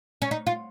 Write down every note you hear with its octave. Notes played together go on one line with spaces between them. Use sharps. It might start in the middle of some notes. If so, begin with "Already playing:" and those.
C#4
D#4
F4